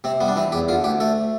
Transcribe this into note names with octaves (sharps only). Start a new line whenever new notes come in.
C3 C4
G3 B3
D4
E3 C4
E2 G4
D3 F4
D2 G4
A3 A4